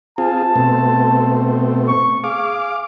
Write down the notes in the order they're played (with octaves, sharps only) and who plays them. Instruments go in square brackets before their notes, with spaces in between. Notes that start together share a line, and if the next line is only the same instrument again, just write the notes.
[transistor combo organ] C4 F4 G#4 [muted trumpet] A5
[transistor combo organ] B2 A3 C4
[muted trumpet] C#6
[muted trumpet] G#4 [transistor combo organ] F5 D6